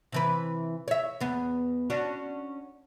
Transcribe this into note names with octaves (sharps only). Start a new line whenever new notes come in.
C3 E3 B4
C#5 E5
E2 B3
C#4 D4 F#4